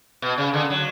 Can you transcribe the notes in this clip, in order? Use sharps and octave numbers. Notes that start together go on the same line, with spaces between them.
B2
C#3
D3
F#3